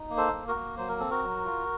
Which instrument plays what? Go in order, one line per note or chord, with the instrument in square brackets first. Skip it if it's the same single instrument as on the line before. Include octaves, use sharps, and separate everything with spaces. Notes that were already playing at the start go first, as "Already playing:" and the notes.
Already playing: [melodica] D#4
A#3
A4 C5
A#3
F#4 A#4
A#3
F#3 C5
A#4
C4 A4
F#4 A#4
F#3
F4